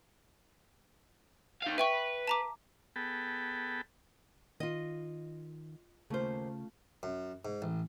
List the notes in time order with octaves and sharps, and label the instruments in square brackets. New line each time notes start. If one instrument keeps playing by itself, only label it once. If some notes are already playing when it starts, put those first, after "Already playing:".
[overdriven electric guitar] D#4 F5
[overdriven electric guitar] B4 [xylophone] E5 G5 C#6
[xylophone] A5 A#5 D6
[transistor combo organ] B3 G#4 A4 G5 A5 B5
[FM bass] D#3 [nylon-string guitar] F4 D#5
[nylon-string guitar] D#2 C5 [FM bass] C#3 [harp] A3 C#4 F4
[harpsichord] F#2
G#2
A1